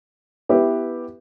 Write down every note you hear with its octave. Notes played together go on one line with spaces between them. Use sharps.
B3 E4 G4 B4 E5